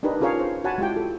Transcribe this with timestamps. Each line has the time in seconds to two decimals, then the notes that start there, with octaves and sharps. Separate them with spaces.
0.03 D4 D#4 G4 A#4 B4 D#5
0.21 C#4 F4 G#4 A#4 C#5 F5
0.39 C5
0.64 F#4 C#5 F#5 G#5 A5 B5
0.78 G#3 E4 F4 G4 G5
0.96 A4